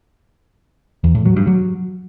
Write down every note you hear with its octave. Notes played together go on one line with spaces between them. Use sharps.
E2
A2
F#3
G2
F#3